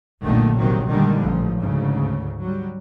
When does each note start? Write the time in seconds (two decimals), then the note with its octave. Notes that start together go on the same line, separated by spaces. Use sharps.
0.24 F#1 B1 A#2 D3 D#3 A3
0.58 G1 C3 D#3 F#3
0.88 A#2 D3 D#3 G3 G#3
1.21 A1 F3
1.60 D2 G#2 C#3
2.42 F#3 G3